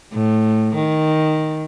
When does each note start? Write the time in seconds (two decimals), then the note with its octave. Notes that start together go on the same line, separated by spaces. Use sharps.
0.13 A2
0.75 D#3